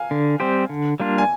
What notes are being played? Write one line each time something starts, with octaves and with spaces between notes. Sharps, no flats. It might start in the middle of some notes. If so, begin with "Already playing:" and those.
Already playing: F5 G#5
D3
G3 C4 G4 C5
D3
G3 A#3 D4 F4
G#5